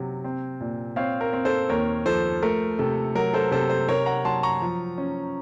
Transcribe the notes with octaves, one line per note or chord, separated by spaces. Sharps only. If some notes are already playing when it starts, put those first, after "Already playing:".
Already playing: C3 F#3
C4
A#2
C4 C#5 F5
A#4
C4
A4 C5
D#2 A#4 C#5
F3 A4 C5
A3 A#4
C3 A4
F#3 A#4
A4 C5
C3 A4 C5
A4 C5
C3 A#4 C#5
F#5 A#5
F#3 A5 C6
A#5 C#6
F3
C#4